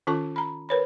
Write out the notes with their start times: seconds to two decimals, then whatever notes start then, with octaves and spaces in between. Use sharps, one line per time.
0.07 D#3 C#4 F4 A4 A5 C#6
0.36 A#5 B5
0.69 A#4 B4 C#5 B5